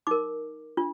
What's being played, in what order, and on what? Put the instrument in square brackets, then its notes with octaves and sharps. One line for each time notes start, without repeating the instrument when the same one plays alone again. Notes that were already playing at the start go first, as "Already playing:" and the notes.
[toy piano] D#4 A#4 D6
D4 F4